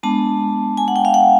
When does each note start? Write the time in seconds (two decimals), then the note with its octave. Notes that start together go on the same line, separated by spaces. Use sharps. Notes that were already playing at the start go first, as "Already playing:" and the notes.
0.03 G#3 B3 D4 A5
0.77 G#5
0.88 F#5
0.96 G5
1.05 F5
1.14 F#5